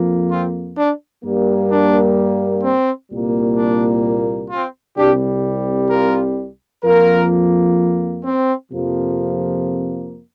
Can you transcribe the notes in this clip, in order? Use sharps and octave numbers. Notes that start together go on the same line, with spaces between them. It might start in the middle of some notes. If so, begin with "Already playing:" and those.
Already playing: F2 F3 A#3
C4 F4
D4
G2 G3 A#3
D4
C4
C2 A#2 G3 A#3
D4
C4 F4
C2 C3 G3 D4 G4
F4 A#4
F2 F3 A#3 F4 A#4
C4
F2 C3 F3 A#3